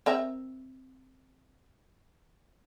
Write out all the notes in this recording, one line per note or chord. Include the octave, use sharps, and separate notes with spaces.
C4 A#4 E5